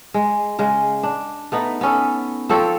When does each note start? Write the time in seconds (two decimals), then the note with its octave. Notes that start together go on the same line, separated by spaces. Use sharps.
0.14 G#3
0.59 C#3 G#3
1.03 D4
1.52 A3 B3 D#4
1.81 B3 C#4 A4
2.49 F3 C4 A4 C#5